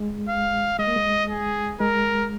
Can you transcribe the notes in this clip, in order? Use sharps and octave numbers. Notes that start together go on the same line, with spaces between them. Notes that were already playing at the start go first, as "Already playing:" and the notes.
Already playing: G#3
F5
G#3 D#5
A#3
G#3
G#4
G#3 A#4